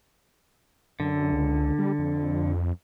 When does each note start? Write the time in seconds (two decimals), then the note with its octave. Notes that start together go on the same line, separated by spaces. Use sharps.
1.00 F#2 D3
1.32 C#2
1.79 G3
1.99 F2